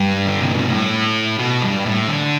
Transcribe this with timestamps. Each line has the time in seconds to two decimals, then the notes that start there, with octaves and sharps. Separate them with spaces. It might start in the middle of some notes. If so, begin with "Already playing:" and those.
Already playing: G2
0.27 D3
0.41 C3
0.54 B2
0.68 A2
1.38 B2
1.62 G2
1.85 A2
2.09 D3